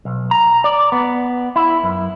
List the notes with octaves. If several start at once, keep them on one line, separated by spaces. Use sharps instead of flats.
B1
A#5
D5
B3
E4
F#2